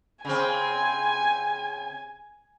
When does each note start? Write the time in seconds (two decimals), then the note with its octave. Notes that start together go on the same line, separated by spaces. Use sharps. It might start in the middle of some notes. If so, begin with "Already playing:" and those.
0.25 C#3 C4 G#5